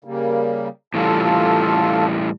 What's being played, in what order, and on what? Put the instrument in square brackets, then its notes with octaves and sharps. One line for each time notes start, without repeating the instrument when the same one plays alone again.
[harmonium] C#3 G3 A#3
[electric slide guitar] A2 E3 G3 [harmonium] F4 A4